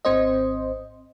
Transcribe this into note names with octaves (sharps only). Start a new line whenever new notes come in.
G#1 C4 C5 D#5